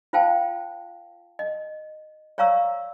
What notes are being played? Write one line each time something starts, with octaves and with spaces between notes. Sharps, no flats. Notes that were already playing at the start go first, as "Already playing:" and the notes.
F4 C5 F5 G5 A5
D#5
C#5 D5 F5 A#5 C#6 E6